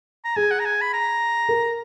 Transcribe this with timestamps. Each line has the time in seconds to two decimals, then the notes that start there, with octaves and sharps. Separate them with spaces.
0.25 A#5
0.36 G#4 G#5
0.51 F#5
0.60 A#5
0.65 G#5
0.81 B5
0.93 A#5
1.49 A#4